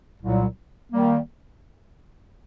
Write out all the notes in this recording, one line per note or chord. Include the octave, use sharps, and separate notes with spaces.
C2 A#2 F#3
D#3 G3 A#3